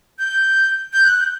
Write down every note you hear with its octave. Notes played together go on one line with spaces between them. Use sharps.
G6
G6
F#6
G6